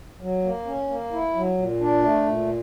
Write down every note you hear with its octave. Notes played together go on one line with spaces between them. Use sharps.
F#3
A#3
C#4
A#3
E4
F#3
A#2
D4
A3
A#2